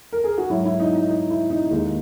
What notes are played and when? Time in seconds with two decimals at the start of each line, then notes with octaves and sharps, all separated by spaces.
0.13 A#4
0.24 G#4
0.38 F#4
0.50 G#2 F#3 E4
0.65 E4
0.80 D#4
0.95 D#4
1.11 D#4
1.30 E4
1.50 D#4
1.71 D#2 D#3 G#3 D#4